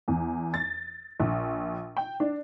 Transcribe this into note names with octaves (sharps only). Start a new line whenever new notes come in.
E2
A6
A#1
G5
D4